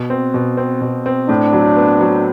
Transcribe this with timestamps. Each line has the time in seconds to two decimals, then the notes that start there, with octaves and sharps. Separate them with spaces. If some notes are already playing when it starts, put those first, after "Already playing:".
Already playing: B2
0.10 C4
0.34 B2
0.57 C4
0.81 B2
1.06 C4
1.29 A2 D4
1.53 F#3
1.76 B3
2.01 F#3